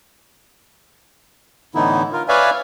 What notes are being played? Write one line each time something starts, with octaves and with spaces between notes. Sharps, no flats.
A2 D3 E3 B3 D#4 E4
F4 A#4
B4 C#5 D5 E5 F5 G#5